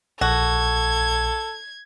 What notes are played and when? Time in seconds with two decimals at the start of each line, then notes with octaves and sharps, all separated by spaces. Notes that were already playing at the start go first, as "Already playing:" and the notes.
0.21 A#1 F#4 A4 G#6